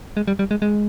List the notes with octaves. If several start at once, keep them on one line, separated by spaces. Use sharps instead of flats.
G#3
G3
G3
G#3
G#3